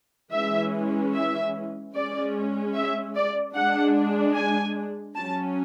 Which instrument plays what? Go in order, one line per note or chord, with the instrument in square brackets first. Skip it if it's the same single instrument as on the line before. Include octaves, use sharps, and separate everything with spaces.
[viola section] E3 G#3 C#4 E5
E5
G#3 C#4 D5
E5
D5
G#3 D4 F#5
G#5
F#3 C#4 A5